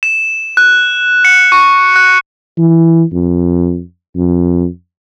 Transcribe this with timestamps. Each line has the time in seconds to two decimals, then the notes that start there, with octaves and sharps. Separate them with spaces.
0.03 E7
0.57 F#6
1.25 C#7
1.52 C#6
1.96 F#6
2.58 E3
3.12 F2
4.15 F2